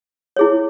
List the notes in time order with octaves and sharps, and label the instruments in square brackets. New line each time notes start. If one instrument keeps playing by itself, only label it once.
[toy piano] E4 G#4 C#5